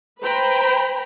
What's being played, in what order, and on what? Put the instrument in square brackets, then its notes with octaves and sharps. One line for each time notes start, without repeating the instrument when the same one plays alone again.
[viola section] B4 C5 G5 A#5 B5